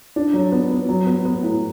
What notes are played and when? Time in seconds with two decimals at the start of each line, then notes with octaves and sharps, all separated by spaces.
0.16 D4
0.33 F#3
0.52 B3
0.71 B3
0.89 F#3
1.06 B3
1.25 B3
1.43 A2